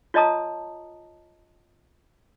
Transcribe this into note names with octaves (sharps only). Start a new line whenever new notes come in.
F4 C#5 D#5 A5 A#5 D#6